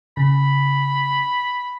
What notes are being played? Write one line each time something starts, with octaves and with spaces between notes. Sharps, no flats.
C#3 B5